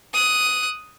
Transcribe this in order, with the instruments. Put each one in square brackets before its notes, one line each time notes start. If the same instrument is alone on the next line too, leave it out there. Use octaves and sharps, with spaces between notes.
[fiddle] D#6 F#6